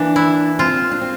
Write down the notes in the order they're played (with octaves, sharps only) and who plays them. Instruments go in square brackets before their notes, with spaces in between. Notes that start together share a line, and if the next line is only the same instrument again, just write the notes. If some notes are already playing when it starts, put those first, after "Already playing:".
Already playing: [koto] E3 A#3 [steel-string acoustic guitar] D4
[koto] E4
[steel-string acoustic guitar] C4 [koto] F4
[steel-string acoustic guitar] D4
C4